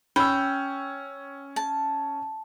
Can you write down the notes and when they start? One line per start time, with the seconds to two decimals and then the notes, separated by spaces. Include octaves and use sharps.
0.16 C#4 G5 B5 E6
1.56 A5